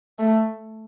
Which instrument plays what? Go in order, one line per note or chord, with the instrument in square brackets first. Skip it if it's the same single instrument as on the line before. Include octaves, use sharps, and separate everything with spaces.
[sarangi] A3